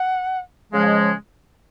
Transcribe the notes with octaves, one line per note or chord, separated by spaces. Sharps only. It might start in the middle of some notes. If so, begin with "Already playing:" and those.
Already playing: F#5
C#3 F3 G#3 F5
D#5
C#5